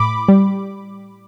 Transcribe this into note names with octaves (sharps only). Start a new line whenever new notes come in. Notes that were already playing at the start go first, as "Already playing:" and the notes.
Already playing: A2 B5 D6
G3